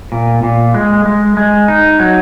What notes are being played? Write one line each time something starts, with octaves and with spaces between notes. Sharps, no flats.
A#2
A#2
G#3
G#3
G#3
D#4
F#3